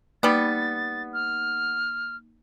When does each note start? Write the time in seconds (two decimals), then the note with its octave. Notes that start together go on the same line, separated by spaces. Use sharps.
0.23 G3 A#3 B3 D#4 A6
1.14 F6